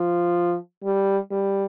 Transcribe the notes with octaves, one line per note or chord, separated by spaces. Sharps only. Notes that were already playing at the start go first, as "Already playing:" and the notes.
Already playing: F3
G3
G3